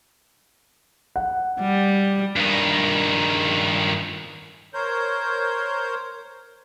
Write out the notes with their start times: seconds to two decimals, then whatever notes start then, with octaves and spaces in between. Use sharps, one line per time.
1.16 F#5
1.61 G3
2.36 G2 D#3
4.74 A#4 C5 C#5 G6